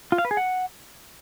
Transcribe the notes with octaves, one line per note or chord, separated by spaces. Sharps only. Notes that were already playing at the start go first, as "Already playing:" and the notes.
F4
F5
B4
G#4
F#5